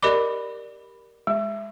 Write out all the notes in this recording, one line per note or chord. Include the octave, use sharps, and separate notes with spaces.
G4 A#4 D5 D#5 B5 D6
G#3